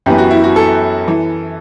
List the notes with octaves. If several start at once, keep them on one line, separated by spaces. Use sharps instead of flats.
F#2 E3 B3 G4
F#4
E4
F#4
A4
E3